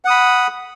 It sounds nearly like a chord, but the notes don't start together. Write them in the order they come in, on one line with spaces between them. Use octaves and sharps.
F#5 D#6 B5